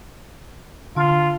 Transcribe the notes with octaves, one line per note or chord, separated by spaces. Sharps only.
D3 F4